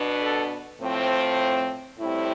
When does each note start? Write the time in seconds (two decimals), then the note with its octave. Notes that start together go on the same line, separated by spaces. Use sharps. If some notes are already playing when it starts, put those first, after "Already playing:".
Already playing: B2 B3 D4
0.21 A4
0.81 A2 F3 C4
1.99 A2 G3 C4 E4